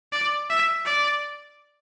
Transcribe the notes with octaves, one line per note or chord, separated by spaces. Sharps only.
D5
E5
D5